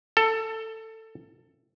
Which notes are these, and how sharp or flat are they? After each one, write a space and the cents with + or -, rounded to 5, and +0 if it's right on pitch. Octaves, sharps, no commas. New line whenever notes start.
A4 +15